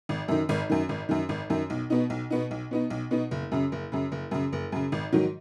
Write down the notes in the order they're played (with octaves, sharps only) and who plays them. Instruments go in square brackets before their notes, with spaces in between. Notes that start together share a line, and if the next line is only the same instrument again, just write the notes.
[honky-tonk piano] G#1
F#2 D#3
G#1
F#2 D#3
G#1
F#2 D#3
G#1
F#2 D#3
B1
B2 B3 D#4
B1
B2 B3 D#4
B1
B2 B3 D#4
B1
B2 B3 D#4
F#1
F#2 C#3
F#1
F#2 C#3
F#1
F#2 C#3
F#1
F#2 C#3
G#1
G#2 D#3 F#3